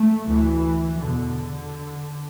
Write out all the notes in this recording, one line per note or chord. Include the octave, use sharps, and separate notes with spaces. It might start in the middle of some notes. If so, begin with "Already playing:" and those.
Already playing: A3
D2 E3
E2 B2 D3